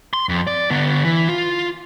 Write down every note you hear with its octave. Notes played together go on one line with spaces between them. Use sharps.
C6
F2
D5
D3 B3
E3
F4